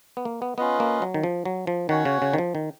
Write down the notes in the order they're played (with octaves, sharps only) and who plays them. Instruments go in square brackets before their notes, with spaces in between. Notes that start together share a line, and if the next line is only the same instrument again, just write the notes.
[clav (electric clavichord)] B3
A#3
B3
[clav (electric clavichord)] B3 [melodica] C#4 F4 B4 D#5
[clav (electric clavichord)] A#3
F#3
D#3
F3
F#3
F3
[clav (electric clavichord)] D#3 [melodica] C#4 F#4 C#5 F#5
[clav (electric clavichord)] C#3
C#3
D#3
F3
D#3